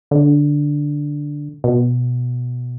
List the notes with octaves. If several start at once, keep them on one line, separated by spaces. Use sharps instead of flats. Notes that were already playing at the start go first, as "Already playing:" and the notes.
D3
B2